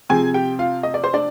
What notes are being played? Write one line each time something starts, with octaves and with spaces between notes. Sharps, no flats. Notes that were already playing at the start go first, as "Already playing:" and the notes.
C3 F3 C4 G#4 G#5
G4 G5
F4 F5
D#5
D5
C5
D4 D5